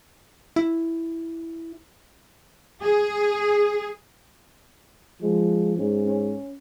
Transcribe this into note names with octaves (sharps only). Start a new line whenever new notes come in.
E4
G#4
F3 G#3
G#2 C#4
C#4